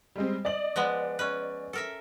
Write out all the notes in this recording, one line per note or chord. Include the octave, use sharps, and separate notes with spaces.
G3 G#3 C4
D5 D#5 F#7
F3 G#3 B3
C#4 B4
A4 A#4 E5